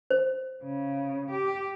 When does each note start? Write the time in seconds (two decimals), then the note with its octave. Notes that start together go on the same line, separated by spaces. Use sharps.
0.11 C5
0.64 C#3
1.32 G4